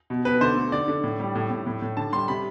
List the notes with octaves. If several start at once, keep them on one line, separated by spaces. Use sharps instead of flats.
B2
B2 B4
D3 C5
A3
D3 D5
D3
A2
G3
A2
A2
A2
A2
D3 A5
G3 C6
C3 B5